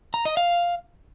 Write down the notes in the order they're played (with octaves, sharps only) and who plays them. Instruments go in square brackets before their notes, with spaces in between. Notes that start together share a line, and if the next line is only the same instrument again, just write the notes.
[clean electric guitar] A#5
D#5
F5